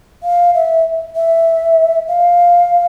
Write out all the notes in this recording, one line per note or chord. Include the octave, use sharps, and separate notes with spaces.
F5
E5
E5
F5